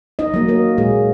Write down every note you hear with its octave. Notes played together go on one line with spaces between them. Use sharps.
D#4 D#5
F#3 A#3
A#3 A#4
A#2 G#3 G#4